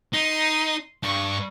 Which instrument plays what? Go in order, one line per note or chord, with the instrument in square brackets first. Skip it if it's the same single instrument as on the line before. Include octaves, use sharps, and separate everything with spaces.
[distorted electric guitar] D#4 [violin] C6 D#7
[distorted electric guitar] G2 [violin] C#6